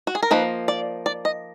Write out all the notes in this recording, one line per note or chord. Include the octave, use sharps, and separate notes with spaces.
F#4
G#4
A#4
F3 A#3 D#4 B4
D5
D5
D#5